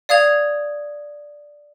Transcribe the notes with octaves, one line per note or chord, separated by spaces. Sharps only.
D5 F5 D#6 G#6 F7